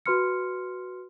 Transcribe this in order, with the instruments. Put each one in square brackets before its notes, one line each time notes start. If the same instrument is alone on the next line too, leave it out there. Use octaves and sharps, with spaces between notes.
[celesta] F#4 B4 C6 F6 C#7